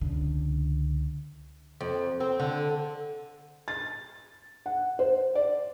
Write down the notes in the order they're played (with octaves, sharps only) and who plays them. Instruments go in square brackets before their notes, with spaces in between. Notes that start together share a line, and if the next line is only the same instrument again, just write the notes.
[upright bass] C#2 D3
[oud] F2
C4
D3
[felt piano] A6
F#5
C5
D5